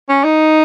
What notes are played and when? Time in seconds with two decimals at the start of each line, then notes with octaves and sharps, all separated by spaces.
0.09 C#4
0.24 D#4